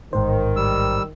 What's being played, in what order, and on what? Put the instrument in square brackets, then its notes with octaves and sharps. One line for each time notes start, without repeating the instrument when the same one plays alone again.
[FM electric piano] A1 G#2 C5 [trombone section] D#3
[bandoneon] G3 E6